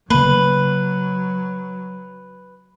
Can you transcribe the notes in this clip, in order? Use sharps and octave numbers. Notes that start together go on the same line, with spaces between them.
C#3 F#3 A#3 B4